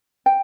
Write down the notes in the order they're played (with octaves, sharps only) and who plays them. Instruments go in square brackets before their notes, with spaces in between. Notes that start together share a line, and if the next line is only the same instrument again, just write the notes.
[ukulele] G5